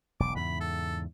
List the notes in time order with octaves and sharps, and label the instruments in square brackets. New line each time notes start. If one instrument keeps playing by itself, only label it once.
[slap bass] E1 B1 [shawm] D6
[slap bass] E2 G#2 C#3 [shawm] B5
[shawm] A4